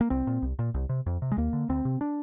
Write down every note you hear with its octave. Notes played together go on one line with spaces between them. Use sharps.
A#3
C2 C4
A#2
C2
A#2
C2
C3
F2
C3
G#3
D#2 A#3
D3
D2 C4
C3
D4